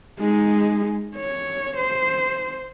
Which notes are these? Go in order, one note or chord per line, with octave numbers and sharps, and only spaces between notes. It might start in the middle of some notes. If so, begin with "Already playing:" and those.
G#3 D#4
C#5
C5